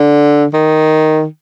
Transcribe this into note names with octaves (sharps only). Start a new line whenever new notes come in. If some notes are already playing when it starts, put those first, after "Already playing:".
Already playing: D3
D#3